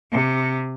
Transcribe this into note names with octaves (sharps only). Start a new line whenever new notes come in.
C3